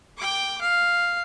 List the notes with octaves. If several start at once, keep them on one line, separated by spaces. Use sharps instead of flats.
G5 D6
F5